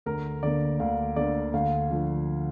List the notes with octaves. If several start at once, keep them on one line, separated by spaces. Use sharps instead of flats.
D2 A#4
D3 A#3 D5
D2 F5
D3 A#3 D5
D2 F5
D3 F3